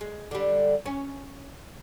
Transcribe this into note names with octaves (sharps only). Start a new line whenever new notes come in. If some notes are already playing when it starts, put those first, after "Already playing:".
G#3
D3 G3
C#4